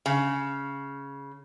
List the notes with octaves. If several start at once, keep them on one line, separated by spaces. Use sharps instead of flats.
C#3